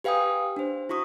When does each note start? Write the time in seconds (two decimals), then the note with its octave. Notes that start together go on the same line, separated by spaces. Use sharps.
0.04 G4 B4 F5 G5 G#5 D#6
0.56 D4 C5
0.89 E4 F#4 C#6 D#6